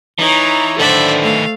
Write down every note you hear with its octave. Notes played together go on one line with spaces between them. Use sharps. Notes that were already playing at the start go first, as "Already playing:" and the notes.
E3 D#4 C#5 A#5
A2 D3 D#3 A4 B4 C5 D5 E5
A3 F5